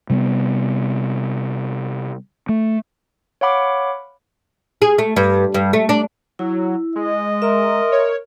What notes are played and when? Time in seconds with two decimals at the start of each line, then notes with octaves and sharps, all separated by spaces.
0.10 C3 G3 A#3 B3
2.49 A3
3.41 C#5 F5 F#5 B5 D6
4.82 G#4
4.98 A3
5.16 G2
5.54 G2
5.73 A3
5.89 D4
6.39 F#3 E4
6.96 G#3 D#5
7.42 A#4 E5 C6
7.92 C#5